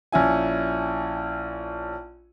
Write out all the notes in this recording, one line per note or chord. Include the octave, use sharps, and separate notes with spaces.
A#1 C#4 E4 G#5